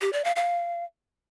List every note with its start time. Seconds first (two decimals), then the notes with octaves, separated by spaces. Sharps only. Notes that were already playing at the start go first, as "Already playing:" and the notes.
0.01 G4
0.13 D5
0.24 F5
0.36 F5